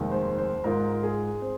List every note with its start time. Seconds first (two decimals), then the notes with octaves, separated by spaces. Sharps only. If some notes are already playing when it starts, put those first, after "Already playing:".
Already playing: F1 D#2 D#3 G#3
0.12 C5
0.38 C5
0.64 G#2 G#3 F4 A#4
1.03 G#4
1.42 C4